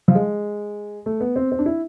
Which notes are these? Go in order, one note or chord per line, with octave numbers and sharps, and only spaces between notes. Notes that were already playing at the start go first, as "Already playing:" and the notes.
F3
G#3
A3
B3
C4
C4
D4
E4